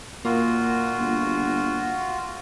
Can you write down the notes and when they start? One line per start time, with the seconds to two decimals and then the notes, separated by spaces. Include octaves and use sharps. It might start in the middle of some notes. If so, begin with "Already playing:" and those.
0.25 A#2 A#3 F4 F#4
1.00 G1